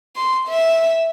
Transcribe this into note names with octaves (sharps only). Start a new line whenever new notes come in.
C6
E5